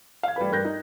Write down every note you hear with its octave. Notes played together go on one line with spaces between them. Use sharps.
F5 G#6
G3 A3 B4 B5
G2 G3 A#4 F#6 G6 A#6
D#4